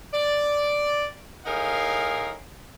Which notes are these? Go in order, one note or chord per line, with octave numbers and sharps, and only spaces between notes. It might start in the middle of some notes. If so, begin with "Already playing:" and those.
D5
A2 D#4 G#4 A#4 F5